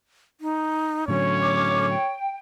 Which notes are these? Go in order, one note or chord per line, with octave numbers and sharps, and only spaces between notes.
D#4
A2 D3 F#3 C#4 C#5
D6
G5